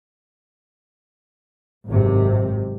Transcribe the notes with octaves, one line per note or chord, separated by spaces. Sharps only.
G#1 F#2 C3